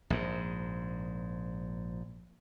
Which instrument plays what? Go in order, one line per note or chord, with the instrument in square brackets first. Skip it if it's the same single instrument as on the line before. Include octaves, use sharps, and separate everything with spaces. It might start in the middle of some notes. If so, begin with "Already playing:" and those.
[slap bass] A#1 G#2